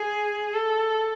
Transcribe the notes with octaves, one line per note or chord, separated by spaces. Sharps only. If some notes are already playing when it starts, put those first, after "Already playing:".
Already playing: G#4
A4